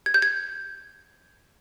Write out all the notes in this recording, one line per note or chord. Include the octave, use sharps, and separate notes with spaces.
G#6
G6
G#6